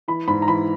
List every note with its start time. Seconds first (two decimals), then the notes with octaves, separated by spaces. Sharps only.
0.08 E3 B5
0.28 G#2 B5
0.42 A#5
0.47 E3 B5